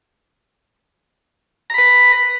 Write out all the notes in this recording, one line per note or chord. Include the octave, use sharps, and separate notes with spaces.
B4 A#5 B5